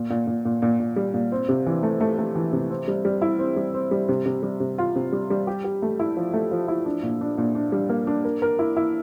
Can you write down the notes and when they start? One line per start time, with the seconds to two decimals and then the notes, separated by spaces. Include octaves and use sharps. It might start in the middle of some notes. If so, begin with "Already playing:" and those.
Already playing: A#2
0.10 A#2
0.27 A#2
0.45 A#2
0.62 A#2
0.80 A#2
0.96 G3
1.14 A#2
1.32 C4
1.49 C3
1.66 E3
1.83 A3
2.00 A3
2.18 A3
2.35 E3
2.53 C3
2.70 C4
2.88 G3
3.05 G3
3.22 E4
3.39 C4
3.56 G3
3.74 C4
3.91 G3
4.08 C3
4.26 C3
4.43 G3
4.60 C3
4.78 F4
4.96 C3
5.12 G3
5.30 G3
5.47 G4
5.64 G4
5.82 A3
5.99 E4
6.17 F3
6.34 A3
6.51 F3
6.68 E4
6.86 D4
7.03 A#2
7.21 D4
7.38 A#2
7.55 D4
7.72 G3
7.89 A#3
8.07 D4
8.24 A#4
8.42 A#4
8.59 E4
8.76 E4